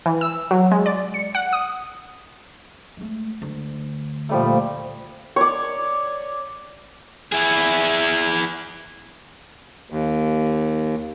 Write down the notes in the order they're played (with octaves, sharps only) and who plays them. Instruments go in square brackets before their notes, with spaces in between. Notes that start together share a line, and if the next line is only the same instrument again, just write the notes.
[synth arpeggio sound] E3
E6
F#3
G#3
D5
C#7
F#5
D#6
[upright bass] G#3 A3
D2
[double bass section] A#2 [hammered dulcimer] F3 G3 A3
[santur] C#5 D5
[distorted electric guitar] E4 G#4
[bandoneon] D#2